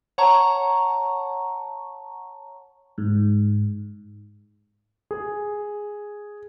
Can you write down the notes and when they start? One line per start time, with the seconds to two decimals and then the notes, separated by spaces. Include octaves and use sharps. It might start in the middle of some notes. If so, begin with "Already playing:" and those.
0.18 C#5 F#5 A5 A#5 C#6
2.98 G#2
5.11 G#4